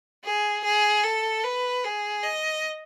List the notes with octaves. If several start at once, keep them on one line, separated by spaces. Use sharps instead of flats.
G#4
G#4
A4
B4
G#4
D#5